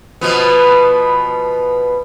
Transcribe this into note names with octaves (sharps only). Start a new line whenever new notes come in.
B2 F3 B3